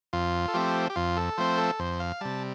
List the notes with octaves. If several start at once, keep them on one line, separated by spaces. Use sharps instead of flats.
F2 F4
A4
F3 A3 C4 G4
G4
F2 F4
A4
F3 A3 C4 C5
A4
F2 C5
F5
C3 G3 A5